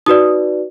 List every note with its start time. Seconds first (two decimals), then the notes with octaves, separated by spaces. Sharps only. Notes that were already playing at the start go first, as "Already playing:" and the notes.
0.06 D#4 F#4 B4 D5 D#6